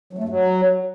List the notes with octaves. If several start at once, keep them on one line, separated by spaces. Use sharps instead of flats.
F#3
A3
G2
F#3